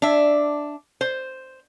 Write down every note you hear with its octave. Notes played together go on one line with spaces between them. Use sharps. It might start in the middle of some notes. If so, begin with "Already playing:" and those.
D4 E5
C5